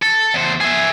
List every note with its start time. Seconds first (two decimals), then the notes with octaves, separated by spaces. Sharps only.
0.02 A4
0.34 E2 C5
0.60 G#4 E5